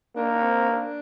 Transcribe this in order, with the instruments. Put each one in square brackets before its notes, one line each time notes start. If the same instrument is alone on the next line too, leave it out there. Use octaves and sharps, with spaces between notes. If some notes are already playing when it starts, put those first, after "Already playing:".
[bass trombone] A#3 [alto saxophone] D4
[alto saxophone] D4
C4
D4